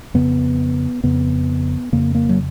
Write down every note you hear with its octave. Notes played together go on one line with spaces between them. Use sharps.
F2 C#3 B3
F2 C#3 B3
F2 C#3 A#3
A#3
F#3